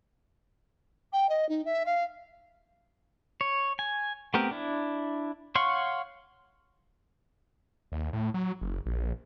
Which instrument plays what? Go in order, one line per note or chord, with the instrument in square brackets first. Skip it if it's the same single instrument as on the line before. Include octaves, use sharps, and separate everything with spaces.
[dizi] G5
D#5
D#4
E5
F5
[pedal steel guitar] C#5
G#5
A3 B3 C4 G4 A#4
D4 E4
C#5 F5 F#5 C6 C#6
[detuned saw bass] D#2
A2
F#3
F#1
A#1